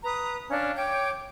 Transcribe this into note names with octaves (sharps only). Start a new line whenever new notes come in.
B4 A#5 D#6
C#4 D4 F5
C#5 G5 D6 G6